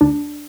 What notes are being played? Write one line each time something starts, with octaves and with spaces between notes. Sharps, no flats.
D2 D4